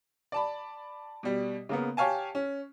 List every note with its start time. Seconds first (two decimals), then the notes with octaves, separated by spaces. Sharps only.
0.32 D5 A5 B5
1.23 B2 G3
1.69 C#3 A#3 B3
1.97 G4 C#5 F5 G#5 A5
2.35 C#4